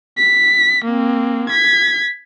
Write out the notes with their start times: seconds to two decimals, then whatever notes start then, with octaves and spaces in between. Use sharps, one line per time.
0.17 B6
0.85 A#3 C4
1.50 G#6 B6